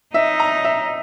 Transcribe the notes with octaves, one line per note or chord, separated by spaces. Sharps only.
D#4 E5
A#5
E5